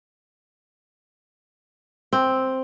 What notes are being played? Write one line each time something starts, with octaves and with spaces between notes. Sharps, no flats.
C4